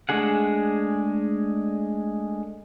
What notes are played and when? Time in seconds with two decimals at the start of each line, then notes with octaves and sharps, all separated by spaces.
0.09 G#3 A3 D4 G#4 F#5